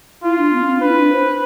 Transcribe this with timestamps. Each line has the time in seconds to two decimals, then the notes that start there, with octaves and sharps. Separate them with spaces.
0.23 E4 F4
0.38 D4
0.53 B3
0.60 D4
0.67 C4
0.81 D4 B4
0.89 E4
0.97 D4
1.12 C5